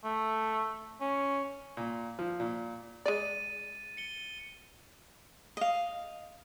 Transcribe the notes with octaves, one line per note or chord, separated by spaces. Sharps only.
A3
C#4
A#2
F3
A#2
G#3 D5 A6 D#7
C#7 G7
D#5 F5